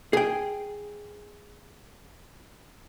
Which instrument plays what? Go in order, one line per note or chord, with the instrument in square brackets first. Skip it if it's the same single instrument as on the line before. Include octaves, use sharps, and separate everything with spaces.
[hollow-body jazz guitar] G#4 G5